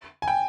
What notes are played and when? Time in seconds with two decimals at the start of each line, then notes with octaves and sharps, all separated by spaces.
0.22 G#5
0.28 G5